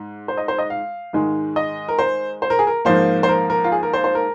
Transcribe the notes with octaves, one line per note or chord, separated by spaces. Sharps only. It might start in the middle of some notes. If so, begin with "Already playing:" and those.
Already playing: G#2
C5
D#5
C5
D#5
F5
G#2 D#3 G#3
D#5
A#4
C5
C5
A#4
G#4
A#4
G#2 F3 A#3 C5
C5
A#4
A#4
F4
G#4
A#4
C5
C5
A#4